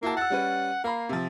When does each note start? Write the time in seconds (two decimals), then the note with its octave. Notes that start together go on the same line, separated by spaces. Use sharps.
0.03 A#3 E4 F#4 A5
0.17 F#5 E6 A6
0.30 G3 C#4 B4
0.84 A#3 F5 A#5 B5
1.09 C3 F3